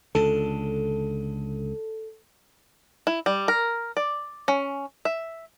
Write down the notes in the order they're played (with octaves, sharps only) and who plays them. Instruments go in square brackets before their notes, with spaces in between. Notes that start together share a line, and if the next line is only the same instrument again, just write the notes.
[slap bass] C#2 D3 [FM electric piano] A4
[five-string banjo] E4
G3
A#4
D5
C#4
E5